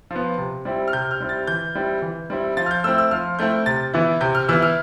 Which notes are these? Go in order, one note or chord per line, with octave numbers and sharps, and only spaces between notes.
F3 B3
C3
G3 C4 E4
F6
C3 G6
F6
G3 C4 E4
A6
E3 G6
G3 C4 E4
E3
G3 C4 E4
F3 A6
F6
G6
A3 C4 E4 E6
E6
F3 F6
A3 C4 E4 G6
C3 A6
E3 B3 E4
C3 G6
F6
E3 B3 E4 E6
F6